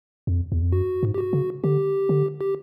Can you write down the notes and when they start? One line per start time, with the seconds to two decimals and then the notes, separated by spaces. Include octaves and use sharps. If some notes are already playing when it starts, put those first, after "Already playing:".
0.27 F2
0.52 E2
0.61 F2
0.72 F#2 F#4
1.03 G#2
1.14 G4
1.18 F#4
1.33 C#3
1.64 D3 G4
2.09 D3
2.41 G4